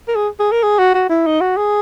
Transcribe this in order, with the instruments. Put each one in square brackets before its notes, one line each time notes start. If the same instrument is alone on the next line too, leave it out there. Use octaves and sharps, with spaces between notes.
[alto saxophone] A#4
G#4
G#4
A#4
G#4
F#4
F#4
E4
D#4
F#4
G#4